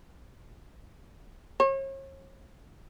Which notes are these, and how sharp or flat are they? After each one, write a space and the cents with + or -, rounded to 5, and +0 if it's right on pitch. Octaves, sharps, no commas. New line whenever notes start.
C#5 -40